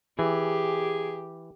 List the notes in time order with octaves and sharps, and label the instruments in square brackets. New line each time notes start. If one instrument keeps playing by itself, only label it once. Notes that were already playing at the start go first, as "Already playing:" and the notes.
[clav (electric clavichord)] E3 [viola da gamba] G4 [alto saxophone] G#4